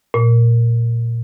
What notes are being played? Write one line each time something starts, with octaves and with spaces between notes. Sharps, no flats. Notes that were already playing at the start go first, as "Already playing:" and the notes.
A#2